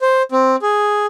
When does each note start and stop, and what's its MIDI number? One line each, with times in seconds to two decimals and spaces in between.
0.01 0.22 72
0.32 0.56 60
0.62 1.06 68